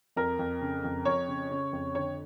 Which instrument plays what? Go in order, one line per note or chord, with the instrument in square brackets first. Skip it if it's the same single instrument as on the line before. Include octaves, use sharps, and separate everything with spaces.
[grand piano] F2 A#4
F2
C#3
F2
F2 C#5
C#3
C#3
F2
D3 C#5